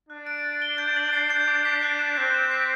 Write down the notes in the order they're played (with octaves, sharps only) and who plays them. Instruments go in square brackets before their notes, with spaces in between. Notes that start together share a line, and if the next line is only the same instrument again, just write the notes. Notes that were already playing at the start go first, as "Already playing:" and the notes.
[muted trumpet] D4 [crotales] F#6
[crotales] D7
A6
G7
G6
F#7
C7
G6
D6
B6
F#6
E7
[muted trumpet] C4 [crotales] F#6
[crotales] E7
B6